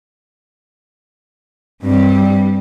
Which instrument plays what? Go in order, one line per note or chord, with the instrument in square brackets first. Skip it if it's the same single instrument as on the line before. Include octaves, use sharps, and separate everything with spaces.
[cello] G2 G3 [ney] C4